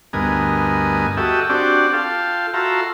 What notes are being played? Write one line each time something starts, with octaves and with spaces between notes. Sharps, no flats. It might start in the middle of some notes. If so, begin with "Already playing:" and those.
D2 G2 B3 A#4 D#5 G#5
F#4 G4 A4 D#5 E5
C4 D4 F#4 G4 D5
F4 A4 F5 G5
F4 F#4 A4 E5 A#5 C6